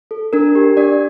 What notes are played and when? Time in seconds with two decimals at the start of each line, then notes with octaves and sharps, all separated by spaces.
0.11 A4
0.33 D4 A#4
0.55 G4
0.77 D4 D5